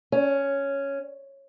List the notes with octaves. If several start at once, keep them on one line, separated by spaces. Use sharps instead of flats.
C#4